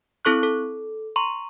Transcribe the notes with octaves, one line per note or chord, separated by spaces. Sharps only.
C4 E4 A4 C#6 F#6
A4
A#5 C6 C#6